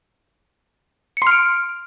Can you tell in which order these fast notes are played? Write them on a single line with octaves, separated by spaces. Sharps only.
C#7 C6 F6 D7